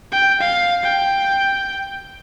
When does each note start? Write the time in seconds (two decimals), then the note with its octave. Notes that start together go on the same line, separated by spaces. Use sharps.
0.12 G5
0.41 F5
0.83 G5